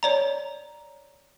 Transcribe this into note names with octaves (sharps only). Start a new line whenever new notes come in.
C#5 D5 A#5